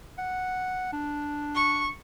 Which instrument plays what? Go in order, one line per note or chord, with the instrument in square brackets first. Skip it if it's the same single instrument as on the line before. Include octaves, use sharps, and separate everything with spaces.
[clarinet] F#5
D4
[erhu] C#6